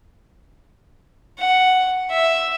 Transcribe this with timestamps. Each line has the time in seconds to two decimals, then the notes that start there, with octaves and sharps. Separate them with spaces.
1.39 F#5
2.11 E5